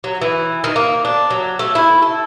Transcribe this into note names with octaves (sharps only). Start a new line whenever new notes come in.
F#3
E3
D#3
A#3
D4
F#3
A3
E4
A4